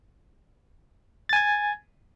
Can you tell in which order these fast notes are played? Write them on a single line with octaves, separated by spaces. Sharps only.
A6 G#5 G#6